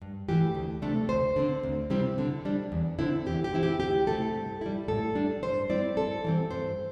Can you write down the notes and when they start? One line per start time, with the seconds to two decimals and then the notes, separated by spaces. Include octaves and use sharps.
0.02 G2
0.29 E3 A3 G4
0.55 D2
0.82 C3 A3 D4 A4
1.09 D2 C5
1.36 D3 C4
1.63 D2
1.90 C3 G3 C4 E4
2.18 D3
2.45 G3 D4
2.72 E2
2.99 D3 C4 E4
3.26 E2 G4
3.44 G4
3.54 E3 C4 E4
3.63 G4
3.80 D2 G4
4.07 C3 A3 C4 E4 A4
4.35 G2
4.61 G3 E4
4.88 A2 A4
5.15 G3 D4
5.43 G2 C5
5.70 G3 C4 E4 D5
5.97 G2 A4
6.24 E3 G3 C4
6.51 G2 C5